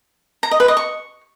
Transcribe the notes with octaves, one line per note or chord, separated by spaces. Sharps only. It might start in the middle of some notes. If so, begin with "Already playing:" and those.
A#5
D#5
B4
D#5
C#6